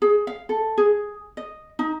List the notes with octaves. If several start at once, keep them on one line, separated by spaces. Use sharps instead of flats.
G#4
F5
A4
G#4
D#5
D#4